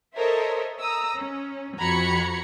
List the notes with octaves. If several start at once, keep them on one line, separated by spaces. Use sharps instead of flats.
A4 A#4 C5 C#5 D#5 E5
A#5 D#6 E6
C#4
F2 F#4 A#5 B5 G#6 C#7